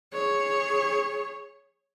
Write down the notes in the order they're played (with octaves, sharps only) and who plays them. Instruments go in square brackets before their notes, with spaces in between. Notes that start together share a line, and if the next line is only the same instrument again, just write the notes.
[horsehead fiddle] G#4 C#5